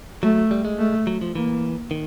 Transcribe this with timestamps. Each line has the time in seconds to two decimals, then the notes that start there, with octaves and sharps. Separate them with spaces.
0.23 F#3 A3
0.51 G3
0.65 G#3
0.78 A3
1.07 F#3
1.21 F3
1.36 E3 A#3
1.91 D#3